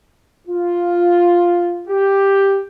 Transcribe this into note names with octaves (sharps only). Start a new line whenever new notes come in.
F4
G4